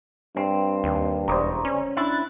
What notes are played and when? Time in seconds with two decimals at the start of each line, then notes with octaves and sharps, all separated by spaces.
0.36 G2 C4
0.84 D#2
1.28 E1 C#3 C5 D5 A#5
1.65 C#4
1.97 D4 E4 F#6 A6